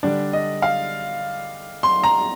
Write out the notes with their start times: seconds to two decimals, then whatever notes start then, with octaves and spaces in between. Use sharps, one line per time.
0.03 D3 G3 D4 D5
0.33 D#5
0.62 F5
1.83 C6
2.04 A#5